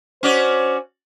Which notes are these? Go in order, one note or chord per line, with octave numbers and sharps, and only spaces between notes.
C#4 F#4 C5 D5